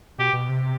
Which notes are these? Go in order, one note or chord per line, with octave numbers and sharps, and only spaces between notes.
B2 G4
B2
C3